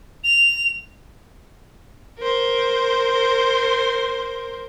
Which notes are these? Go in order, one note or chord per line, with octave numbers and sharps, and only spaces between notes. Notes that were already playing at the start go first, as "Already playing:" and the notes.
F7
A#4 C5